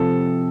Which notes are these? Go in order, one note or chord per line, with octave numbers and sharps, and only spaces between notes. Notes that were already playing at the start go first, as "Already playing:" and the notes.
Already playing: C3 F3 A4